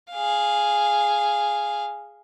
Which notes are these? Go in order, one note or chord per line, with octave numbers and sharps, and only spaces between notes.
G#4 F5